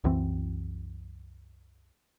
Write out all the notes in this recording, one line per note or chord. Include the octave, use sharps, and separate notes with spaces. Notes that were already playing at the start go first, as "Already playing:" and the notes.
C2 F#2 E3 C4